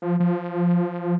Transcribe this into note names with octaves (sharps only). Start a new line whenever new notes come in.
F3
F3